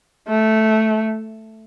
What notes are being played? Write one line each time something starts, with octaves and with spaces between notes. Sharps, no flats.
A3